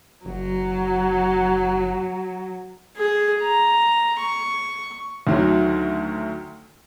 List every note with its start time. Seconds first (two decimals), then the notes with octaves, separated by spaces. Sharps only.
0.25 F#1 F#3
2.97 G#4
3.42 A#5
4.19 C#6
5.27 D2 D#3 F#3